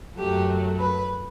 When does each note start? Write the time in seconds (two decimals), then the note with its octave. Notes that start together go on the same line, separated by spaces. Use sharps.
0.17 F#2 F#3 A3 G4
0.78 B4